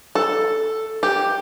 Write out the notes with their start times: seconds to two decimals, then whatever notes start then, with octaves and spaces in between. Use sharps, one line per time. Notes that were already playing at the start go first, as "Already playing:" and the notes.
0.15 A4
1.03 G4